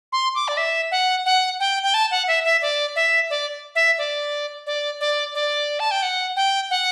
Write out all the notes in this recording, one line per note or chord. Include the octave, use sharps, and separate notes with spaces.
C6
D6
D5
E5
F#5
F#5
G5
G5
A5
F#5
E5
E5
D5
E5
D5
E5
D5
D5
D5
D5
A5
G5
F#5
G5
F#5